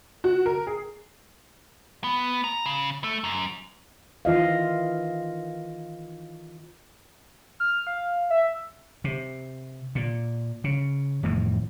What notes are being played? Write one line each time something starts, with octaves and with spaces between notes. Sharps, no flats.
F#4
A#4
G#4
B3
A#5
C#3
A3
F#2
D#3 E3 F4 D#5 F5
F6
F5
E5
C3
A#2
C#3
F2 A2 D#3 E3